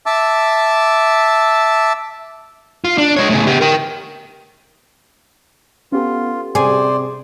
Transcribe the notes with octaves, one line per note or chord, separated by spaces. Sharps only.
E5 A5 D6 E6
F4
D4
G#3 C#5
A2 C#3
B3 G4
A#4 G5
B3 C#4 F4 G4 A4
C3 G#4 C5 D5